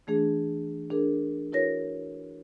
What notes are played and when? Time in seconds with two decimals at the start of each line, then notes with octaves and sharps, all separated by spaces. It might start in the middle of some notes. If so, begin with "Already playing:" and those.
0.07 E3 A3 D4 G#4
0.90 D4 G#4 A#4
1.52 E4 F#4 A#4 B4 C#5 A#6